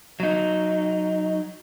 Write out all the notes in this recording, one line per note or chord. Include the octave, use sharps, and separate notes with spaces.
F#3 D#4